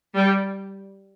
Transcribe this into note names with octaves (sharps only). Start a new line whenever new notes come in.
G3